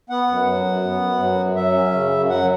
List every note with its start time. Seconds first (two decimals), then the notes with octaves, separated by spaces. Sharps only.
0.10 B3 F#5
0.28 F#2
0.46 F#3
0.65 F#2
0.83 B3
1.01 F#2
1.19 F#3
1.38 F#2
1.56 F#3 E5
1.74 C#4
1.93 C#3
2.10 F#2
2.29 F#3 F#5